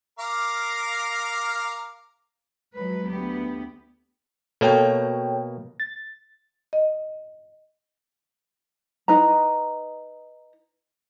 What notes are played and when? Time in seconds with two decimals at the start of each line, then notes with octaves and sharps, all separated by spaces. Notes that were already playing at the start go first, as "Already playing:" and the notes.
0.19 A#4 F5 D6
2.74 F3 F#3 G#3 B4
3.08 D2 B3 G4
4.61 B2 A#3 A4 C#5 G5
5.80 A6
6.73 D#5
9.08 D#4 B4 D#5 A#5